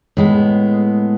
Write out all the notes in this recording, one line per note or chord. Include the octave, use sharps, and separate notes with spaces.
A2 G#3 B3